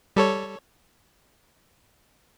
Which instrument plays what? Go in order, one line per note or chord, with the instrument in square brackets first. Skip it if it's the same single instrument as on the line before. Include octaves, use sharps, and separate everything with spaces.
[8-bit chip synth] G3 A4 C#5